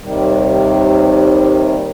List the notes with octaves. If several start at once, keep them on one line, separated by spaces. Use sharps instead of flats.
D#2 C3 D#3 G3